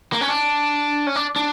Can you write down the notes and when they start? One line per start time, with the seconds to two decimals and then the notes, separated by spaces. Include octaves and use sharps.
0.13 A#3
0.21 C#4
0.29 D4
1.07 C#4
1.16 D4
1.36 D4